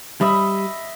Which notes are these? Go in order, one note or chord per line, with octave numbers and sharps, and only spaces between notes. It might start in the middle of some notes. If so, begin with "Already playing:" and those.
G3 D#5 E5 B5